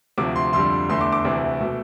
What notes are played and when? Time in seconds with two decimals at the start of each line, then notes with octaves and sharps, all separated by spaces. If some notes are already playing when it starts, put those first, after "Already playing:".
0.18 D2 C3 F3 D6
0.36 C6
0.53 F2 D3 G3 C6
0.89 E2 D3 A3 C6
1.01 D6
1.12 D6
1.25 D2 C3 E3 A3
1.60 B2 A3